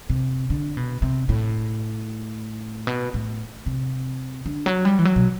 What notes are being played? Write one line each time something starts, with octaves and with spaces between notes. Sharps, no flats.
C3
D3
B2
C3
A2
B2
A2
C3
D3
F#3
G3
E3
F#3
B2